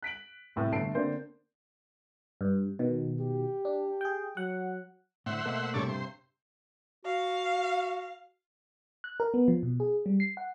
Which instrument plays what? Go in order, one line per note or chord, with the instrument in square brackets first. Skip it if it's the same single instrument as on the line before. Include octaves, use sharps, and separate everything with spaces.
[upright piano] F#6 B6 D7 F#7
A2 C3
G1 A3 A5 C7 D7
D3 A#3 C4 D4 A#4 C5
[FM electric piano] G2
B2 D#3
[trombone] G4
[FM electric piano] D4
G#4 G5
[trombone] F#3 [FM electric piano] F#5
[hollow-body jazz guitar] A2 D3 [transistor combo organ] C5 E5 F#5
[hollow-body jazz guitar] B2 A3 A#3
[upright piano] G2 C3 [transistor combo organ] A4 C#5 D5
[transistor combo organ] C5
[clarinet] F#4 [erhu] F5
[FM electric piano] F#6
A#4
B3
F3
B2
G#4
G3
C7
F#5